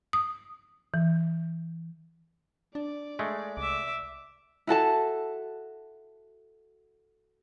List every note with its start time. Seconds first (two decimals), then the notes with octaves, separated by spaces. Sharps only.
0.13 D#6
0.94 E3
2.75 D4 D5
3.19 G#3 A3
3.57 C2 E5 D6
4.67 E4 F#4 A4 A5